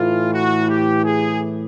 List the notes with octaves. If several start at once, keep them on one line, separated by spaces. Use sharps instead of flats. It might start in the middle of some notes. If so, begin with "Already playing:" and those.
Already playing: A2 E3 F4
F#4
G4
G#4